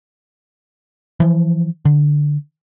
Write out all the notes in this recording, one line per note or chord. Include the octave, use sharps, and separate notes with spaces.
E3 F3
D3